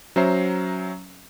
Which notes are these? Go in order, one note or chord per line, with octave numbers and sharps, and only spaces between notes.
F#3 C#4 C5 E5 A#5 C7